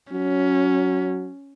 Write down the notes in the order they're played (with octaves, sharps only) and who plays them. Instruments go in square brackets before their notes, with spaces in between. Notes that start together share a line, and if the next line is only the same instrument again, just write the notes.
[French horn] F#3 [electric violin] C#4